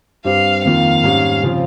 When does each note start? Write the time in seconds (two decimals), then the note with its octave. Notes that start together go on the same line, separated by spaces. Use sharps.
0.25 G2 G3 C4 G4 F5
0.64 F2 D#3 A#3 F4 F5
1.03 G#2 G3 C#4
1.43 C#3 F3 C4 F4